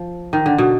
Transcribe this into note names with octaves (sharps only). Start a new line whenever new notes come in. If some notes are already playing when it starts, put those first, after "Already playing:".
Already playing: F3
D#3
D3
B2